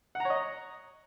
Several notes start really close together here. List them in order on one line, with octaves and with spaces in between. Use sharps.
F#5 A#5 C#5 D#5